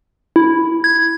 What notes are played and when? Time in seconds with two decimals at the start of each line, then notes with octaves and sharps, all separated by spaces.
0.36 E4
0.84 G#6